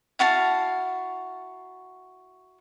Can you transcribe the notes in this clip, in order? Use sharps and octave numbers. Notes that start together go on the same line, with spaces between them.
E4 F#4 F5 A5